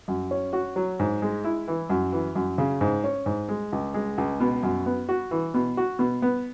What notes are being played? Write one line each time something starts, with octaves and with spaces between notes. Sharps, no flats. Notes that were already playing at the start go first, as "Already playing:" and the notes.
F#2
C#4
F#4
F#3
G#2
G#3
E4
E3
F#2
E3
F#2
C#3
G#2
C#4
G#2
G#3
C#2
G#3
C#2
B2
F#2
B3
F#4
E3
B2
F#4
B2
B3